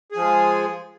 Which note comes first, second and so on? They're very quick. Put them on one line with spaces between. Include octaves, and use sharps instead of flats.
G#4 F3 G#3